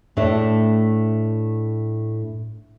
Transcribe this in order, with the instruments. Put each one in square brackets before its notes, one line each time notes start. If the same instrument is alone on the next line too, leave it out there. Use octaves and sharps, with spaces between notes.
[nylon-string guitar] A2 A3 D4